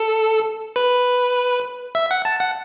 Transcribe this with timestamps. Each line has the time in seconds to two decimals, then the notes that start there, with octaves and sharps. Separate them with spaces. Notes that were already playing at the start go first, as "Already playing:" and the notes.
Already playing: A4
0.76 B4
1.95 E5
2.11 F#5
2.25 A5
2.40 F#5